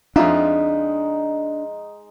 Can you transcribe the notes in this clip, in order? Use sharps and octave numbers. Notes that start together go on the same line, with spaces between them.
F2 G#3 D4 D#4 F4 E5